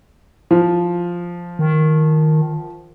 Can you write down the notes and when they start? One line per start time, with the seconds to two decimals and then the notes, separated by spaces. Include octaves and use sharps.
0.51 F3
1.59 D#3